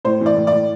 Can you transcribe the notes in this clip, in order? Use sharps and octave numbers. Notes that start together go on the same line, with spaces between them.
A2 C5
E3
D5
A2
D5
A2